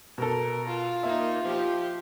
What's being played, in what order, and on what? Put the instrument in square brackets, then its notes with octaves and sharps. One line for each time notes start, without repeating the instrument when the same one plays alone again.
[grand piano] B2 A4 [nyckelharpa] A#4
[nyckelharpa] F4
[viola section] A#3 D#4 [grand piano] E5
[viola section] F3 G4